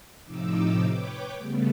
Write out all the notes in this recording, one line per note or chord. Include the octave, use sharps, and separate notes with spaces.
A2 C3 F3 D#4 D6 E6
B4 C#5 G5 D6
C#3 G3 A3 B3